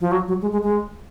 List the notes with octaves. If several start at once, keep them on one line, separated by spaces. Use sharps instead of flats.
F3
F#3
F#3
G#3
G#3
G#3